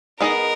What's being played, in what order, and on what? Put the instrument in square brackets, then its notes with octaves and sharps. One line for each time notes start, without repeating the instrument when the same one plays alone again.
[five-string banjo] B3 D#4 G#4 D#5 [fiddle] A#4